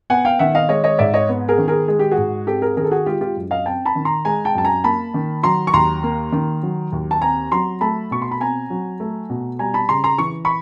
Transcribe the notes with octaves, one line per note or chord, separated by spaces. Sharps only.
B3 F#5 G#5
F5 G5
D#3 E5 F#5
D#5 F5
G#3 C#5 D#5
C#5 D#5
G#2 D5 E5
C#5 D#5
B3
G#4 A#4
D#3
G#4 A#4
G#3 G#4
G4
F#4 G#4
G#2
C4 G4 A4
G#4 A#4
D#3 G#4 A#4
A4
F#4 G#4
G#3 F4 G4
F4 G4
F#2
D#5 F5
C4 G5 A5
A5 B5
D#3
A#5 C6
G#3 G#5 A#5
G5 A5
F#2 A5
G#5 A#5
A#3 A5 B5
D#3
F#3 A#5 C6
C#6
D#2 A#5 C6
A#3
D#3
F#3
D#2
A5
C4 G#5 A#5
F#3 A#5 C6
A3 A5 B5
B2 C#6
C6
B5
C4 G#5 A#5
F#3
A3
B2
G3 G#5 A#5
A5 B5
C#3 A#5 C6
A#5 C6
E3 C#6
B5 C#6